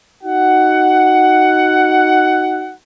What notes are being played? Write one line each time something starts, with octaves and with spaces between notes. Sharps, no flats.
D#4 F#4 F#5